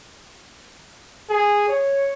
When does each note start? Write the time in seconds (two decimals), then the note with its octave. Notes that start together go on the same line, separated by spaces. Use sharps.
1.30 G#4
1.68 C#5